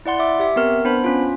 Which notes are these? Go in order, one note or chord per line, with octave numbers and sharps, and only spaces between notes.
E4 D5 F#5 C6
E5 D6
G4 E5
B3 C4 A#4 F6
B3 D4 C5 B5
C#4 F4